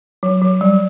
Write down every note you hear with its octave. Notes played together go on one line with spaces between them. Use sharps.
F#3
F#3
G3